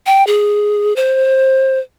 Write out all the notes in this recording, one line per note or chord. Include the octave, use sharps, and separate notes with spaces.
G5
G#4
C5